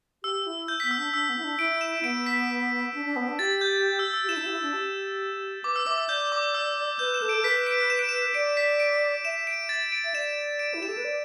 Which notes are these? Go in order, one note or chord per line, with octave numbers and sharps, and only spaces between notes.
G4 E6
E4
G6
B6
B3
E6
D4
D4 E6
B3
E4
D4
E4 D7
E7
B3 D7
B6
D4
D4
B3
D4
G4 A6
G6
E6
E6
G4
E4 E7
D4
E4
G4
E4
D4
G4
B4 D6
E6
E5 D6
E6
D5 G6
D6
E6
B4 G6
E7
A4
D7
A4
B4 B6
D7
E7
D7
E7
D5 D7
B6
D7
E5 E7
D7
A6
D7
E5
D5 E7
D7
E4
G4 E7
A4
B4
D5